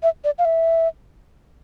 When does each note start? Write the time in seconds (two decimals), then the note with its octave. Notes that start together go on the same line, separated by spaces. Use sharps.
0.03 E5
0.24 D5
0.39 F5
0.45 E5